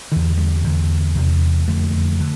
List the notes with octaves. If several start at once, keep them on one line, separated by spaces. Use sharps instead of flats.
E2 D3 E3
G3
E2 D3
E2 C3
F2 D3 A3
D3